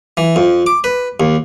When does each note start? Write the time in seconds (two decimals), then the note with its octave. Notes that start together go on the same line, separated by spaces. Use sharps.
0.17 E3
0.36 F2
0.67 D6
0.84 B4
1.20 D#2